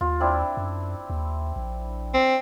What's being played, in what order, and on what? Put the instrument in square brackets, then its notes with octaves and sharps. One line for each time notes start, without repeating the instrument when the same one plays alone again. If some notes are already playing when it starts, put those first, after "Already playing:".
[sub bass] D#2 [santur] F4
[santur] C4 D4 E4
[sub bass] F#2
D#2
A#1
[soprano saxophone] C4